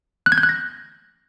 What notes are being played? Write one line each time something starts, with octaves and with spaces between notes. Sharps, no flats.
F#6
G#6
G6
F#6
A#6